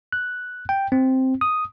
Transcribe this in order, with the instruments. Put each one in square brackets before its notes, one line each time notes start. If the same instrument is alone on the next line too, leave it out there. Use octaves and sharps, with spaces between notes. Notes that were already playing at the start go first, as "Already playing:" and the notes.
[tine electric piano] F#6
G5
C4
D#6